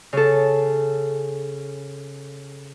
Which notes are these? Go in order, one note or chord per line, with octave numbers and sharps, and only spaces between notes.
C#3 A4